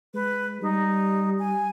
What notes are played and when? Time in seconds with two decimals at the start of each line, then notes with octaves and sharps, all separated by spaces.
0.14 G#3 B4
0.62 G3 D#4
1.39 G#5